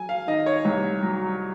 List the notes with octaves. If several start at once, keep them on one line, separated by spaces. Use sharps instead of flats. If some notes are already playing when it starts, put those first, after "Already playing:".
Already playing: F#3 G#5
F5
D#3 D#5
C#5
C2
F#3